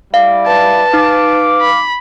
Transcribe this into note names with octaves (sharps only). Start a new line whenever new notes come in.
G3 E4 D5 F5
B4 A5
D#4 F5 D6
B5